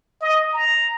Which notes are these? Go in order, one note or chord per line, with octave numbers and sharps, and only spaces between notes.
D#5
A#5